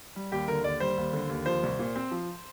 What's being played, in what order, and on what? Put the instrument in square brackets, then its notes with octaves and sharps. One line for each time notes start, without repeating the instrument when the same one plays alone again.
[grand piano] G3
D#2 G4
D3 A#4
D#2 D5
G3 C5
D#2
D3
D#2
F3 C5
C2
A#2
C4
F3